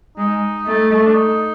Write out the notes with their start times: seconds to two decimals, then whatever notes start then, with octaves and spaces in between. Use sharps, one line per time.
0.18 G#3 D#4
0.66 A3
1.05 D4
1.15 D#4